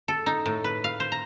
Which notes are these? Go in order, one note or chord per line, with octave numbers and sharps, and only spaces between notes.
A4
D#4
A2
B4
F5
C5
A#5